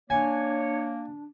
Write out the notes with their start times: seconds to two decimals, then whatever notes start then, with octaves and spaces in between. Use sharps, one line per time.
0.10 A#3 D4 C#5 G#5